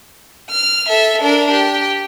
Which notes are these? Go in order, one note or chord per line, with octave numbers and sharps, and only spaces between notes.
F6
A4 E5
D4 A#4
G4